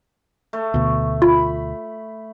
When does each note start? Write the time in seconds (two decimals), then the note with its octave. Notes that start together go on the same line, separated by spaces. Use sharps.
0.53 A3
0.74 D2 B2
1.22 F4 B5